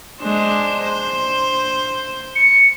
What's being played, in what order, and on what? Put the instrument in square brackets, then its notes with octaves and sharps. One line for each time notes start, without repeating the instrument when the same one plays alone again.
[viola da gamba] G#3 D4 C5
C5
[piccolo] C#7